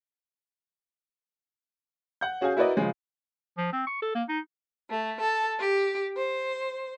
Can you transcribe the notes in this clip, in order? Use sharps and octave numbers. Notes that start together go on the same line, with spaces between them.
F#5 G6
C#4 F#4 G#4 F5 G#5
E4 F#4 A#4 B4 D5 D#5
C#3 F3 G#3 C#4
F3
C4
C#6
A4
A#3
D#4
A3
A4
G4
C5